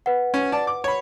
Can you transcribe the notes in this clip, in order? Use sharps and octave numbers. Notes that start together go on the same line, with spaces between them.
B4 F#5
C#4
D5 A5
D6
C#5 B5